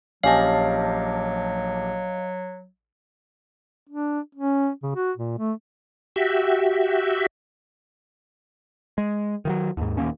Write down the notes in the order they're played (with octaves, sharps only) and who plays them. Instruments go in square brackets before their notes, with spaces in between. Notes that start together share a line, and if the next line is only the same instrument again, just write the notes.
[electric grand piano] A#1 G4 A5 [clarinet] F#3 [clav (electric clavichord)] C#4 [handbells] D#5 F5
[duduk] D4
C#4
C#3
F#4
A#2
A3
[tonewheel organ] F#4 G4 E5
[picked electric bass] G#3
D#3 E3 F#3
D#2 G#2
D#1 D#2 A#3 C#4